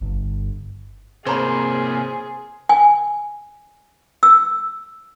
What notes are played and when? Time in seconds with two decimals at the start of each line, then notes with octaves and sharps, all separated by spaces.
0.01 G1
1.26 C3 A#3 G#4 C5 C#5 A#5 B5
2.69 G#5
4.23 E6